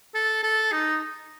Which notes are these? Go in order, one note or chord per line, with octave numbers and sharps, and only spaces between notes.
A4
A4
D#4